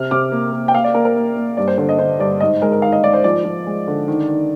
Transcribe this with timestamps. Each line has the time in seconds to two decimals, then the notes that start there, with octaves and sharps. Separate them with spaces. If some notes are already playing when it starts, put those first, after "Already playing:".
Already playing: C3 F6
0.11 C3 D6
0.32 A#3
0.53 A#3
0.68 G5
0.74 A#3 F5
0.84 D5
0.95 A#3 A#4
1.05 A#4
1.16 A#3
1.37 A#3
1.57 G2 D5
1.68 C5
1.78 D3 C5
1.89 D#5
1.99 D3 C5
2.20 G2 D5
2.40 G#2 D#5
2.62 G#3 A#4
2.72 A#4
2.82 D#3 F5
2.92 D#5
3.03 G#2 D5
3.13 C5
3.24 F3 D5
3.45 F3
3.67 G#3
3.87 D3
4.08 D#3
4.28 D#3